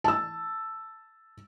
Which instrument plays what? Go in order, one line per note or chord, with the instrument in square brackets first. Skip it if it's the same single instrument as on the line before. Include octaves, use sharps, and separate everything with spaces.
[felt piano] A5 E6